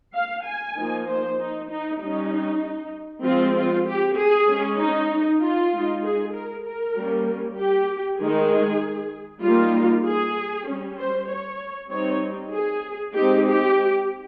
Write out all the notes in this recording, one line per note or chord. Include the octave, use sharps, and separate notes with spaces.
F5
G#5
F3 A#3 D#4
C5
D#4
D#4
G3 C#4 D#4
F3 G#3 C4 F4
F4
G4
G#4
G#3 C#4
D#4
F4
G#3 D#4
G#4
A#4
A#4
G3 A#3 C#4
G4
D#3 G#3 D#4 G#4
G3 A#3 D#4 F4
G#4
G3 C#4
C5
C#5
G3 C4 D#4 C#5
G#4
G#3 C4 D#4 G4
G4